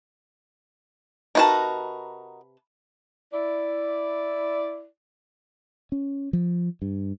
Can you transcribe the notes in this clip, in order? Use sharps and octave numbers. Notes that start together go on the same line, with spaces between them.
C3 D#4 F#4 A#4 B4 A5
E4 D5
C#4
F3
G2